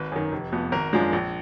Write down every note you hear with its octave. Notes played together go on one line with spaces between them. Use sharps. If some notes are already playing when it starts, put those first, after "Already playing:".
Already playing: G#1 B4
F#2 D#3
F1
F2 F3 B3
G#1 A#4
F#2 F3 G#3 D4
A#1